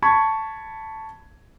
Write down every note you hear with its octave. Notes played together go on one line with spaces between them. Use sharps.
A5 B5 C#6 G#6